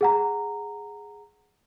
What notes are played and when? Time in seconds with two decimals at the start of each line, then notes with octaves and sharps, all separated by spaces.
0.01 G#4 F#5 A#5